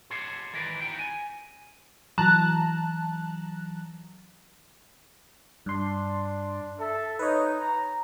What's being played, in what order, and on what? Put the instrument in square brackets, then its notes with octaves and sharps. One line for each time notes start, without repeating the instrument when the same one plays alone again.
[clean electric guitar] G4 A4 C5 C#5 F#5
D#3 E3 E4 A#4 B4 D5
B3 D#4 F#4 G5
G#5
[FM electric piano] E3 F#3 [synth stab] A5 A#5 F#6
[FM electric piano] G2 C6 [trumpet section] D4
[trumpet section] A4 E5
[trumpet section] D#4 [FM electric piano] B4 C#5
[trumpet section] A#5